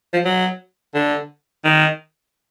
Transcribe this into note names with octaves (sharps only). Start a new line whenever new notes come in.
F3
F#3
D3
D#3